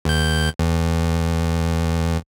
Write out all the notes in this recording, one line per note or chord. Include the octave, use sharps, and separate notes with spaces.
D#2 G6
E2